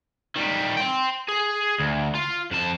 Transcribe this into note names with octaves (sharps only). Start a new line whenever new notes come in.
D#3 G3
G5 C6
G#4
D2
F4
F2 A5